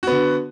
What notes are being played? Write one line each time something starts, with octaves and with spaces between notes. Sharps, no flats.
D3 B3 F#4